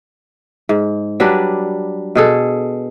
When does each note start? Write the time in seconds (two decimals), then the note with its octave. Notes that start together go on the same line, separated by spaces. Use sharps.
0.69 G#2
1.20 F#3 G3 D4 B4
2.15 B2 G#4 A4